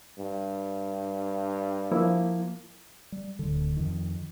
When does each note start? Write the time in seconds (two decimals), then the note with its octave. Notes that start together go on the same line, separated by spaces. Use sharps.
0.18 G2
1.92 F3 A#3 E4
3.12 G3
3.39 D1 D3
3.77 F2 D#3